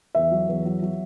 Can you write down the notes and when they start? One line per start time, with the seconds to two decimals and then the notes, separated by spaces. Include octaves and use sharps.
0.15 E2 E5
0.31 F#3
0.49 E2
0.65 F#3
0.82 F#3